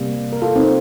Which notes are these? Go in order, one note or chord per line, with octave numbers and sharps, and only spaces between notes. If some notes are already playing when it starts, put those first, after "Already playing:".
Already playing: C3 G3 A#3
A#4
F4 A4
C4 D#4